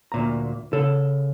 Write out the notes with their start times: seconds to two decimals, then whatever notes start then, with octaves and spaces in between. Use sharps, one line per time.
0.12 D2 A#2 A#5
0.73 C#3 A4